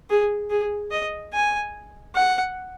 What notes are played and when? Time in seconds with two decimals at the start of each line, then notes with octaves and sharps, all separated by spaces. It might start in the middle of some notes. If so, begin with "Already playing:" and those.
0.10 G#4
0.50 G#4
0.91 D#5
1.33 G#5
2.15 F#5